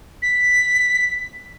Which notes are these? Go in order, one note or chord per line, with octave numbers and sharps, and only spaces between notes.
B6